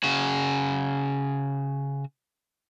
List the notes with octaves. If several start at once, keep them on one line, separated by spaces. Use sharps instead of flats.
C#3 F#4